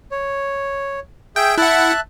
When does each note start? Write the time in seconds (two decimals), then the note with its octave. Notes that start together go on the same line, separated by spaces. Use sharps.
0.11 C#5
1.36 G#4 E5 G5
1.58 E4 E5 F#5 A5 F#6